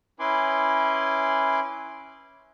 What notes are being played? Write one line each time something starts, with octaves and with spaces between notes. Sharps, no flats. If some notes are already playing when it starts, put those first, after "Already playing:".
C#4 E4 B4 G#5 C6 D6